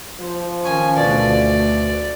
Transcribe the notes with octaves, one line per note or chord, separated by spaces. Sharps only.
F3 C5
D#3 C#4 G#5
D2 B2 D3 D5